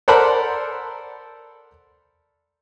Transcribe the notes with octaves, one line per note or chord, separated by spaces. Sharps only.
A4 A#4 C5 D5 F#5 B5